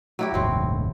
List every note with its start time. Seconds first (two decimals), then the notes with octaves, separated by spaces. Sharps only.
0.19 F#3 E4 G4
0.34 D#1 G#1 D#2 F#3 C4